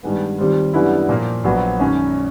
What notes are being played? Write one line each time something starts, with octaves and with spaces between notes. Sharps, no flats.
G2 D#3 G#3 B3
D#2 D#3 G3 C4 F4
F#2 D3 G3 B3 E4
A#2 F3 A#3
A#1 A#2 F#3 B3
F#2 D#3 G#3 C#4